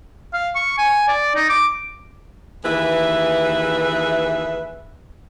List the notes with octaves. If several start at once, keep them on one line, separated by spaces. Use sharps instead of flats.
F5
C#6
G#5
D5
D#4
D6
D#2 E3 G#4 B4 E5